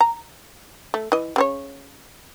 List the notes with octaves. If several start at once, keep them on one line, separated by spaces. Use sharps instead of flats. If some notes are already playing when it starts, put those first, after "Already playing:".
A#5
A3
E3 D#5
C#3 C4 C#5